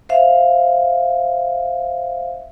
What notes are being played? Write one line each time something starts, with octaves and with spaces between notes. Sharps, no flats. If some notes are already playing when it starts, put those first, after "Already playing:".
C5 E5 F5